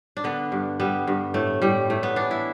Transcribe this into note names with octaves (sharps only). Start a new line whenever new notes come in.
D4
D3 B3
G2
G3 B3
G2
A2 A3
A2 G3
A2 A3
B3
E3 D4
E4